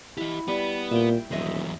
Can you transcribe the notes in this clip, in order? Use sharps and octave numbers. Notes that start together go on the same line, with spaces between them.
E4 G4 D#5 F#5
G3 B3
A#2 E5 G5
D#1 E2 F#3 C5 D#5 E5